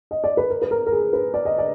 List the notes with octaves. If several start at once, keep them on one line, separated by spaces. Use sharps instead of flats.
D#5
D5
B4
A#4
B4
A#4
A#4
G#4
B4
D5
D#5
D5